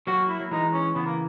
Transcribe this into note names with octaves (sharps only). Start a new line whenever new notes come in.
F#3 A#3 F#4
E4
F#3
E3 G#3 D#4
C#4
C#3 E3 B3
A#3